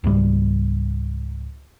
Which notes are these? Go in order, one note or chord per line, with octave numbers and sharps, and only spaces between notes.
C#2 G#2 G3